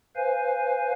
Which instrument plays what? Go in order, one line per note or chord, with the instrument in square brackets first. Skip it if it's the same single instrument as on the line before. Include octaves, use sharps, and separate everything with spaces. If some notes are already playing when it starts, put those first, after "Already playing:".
[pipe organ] B4 C5 F5 G#5